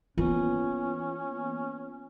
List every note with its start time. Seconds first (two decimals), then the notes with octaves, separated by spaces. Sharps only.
0.18 E3 A#3 B3 C#4 F4